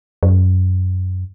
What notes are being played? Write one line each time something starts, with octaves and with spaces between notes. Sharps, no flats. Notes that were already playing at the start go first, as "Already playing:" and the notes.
F#2